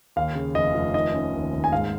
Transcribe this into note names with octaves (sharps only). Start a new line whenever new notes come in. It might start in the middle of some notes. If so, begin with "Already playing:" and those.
D#2 F5
C#3
F1 D#5
F1
D#3 D#5
C#4
D#2
D#2
G#5
G#2 F5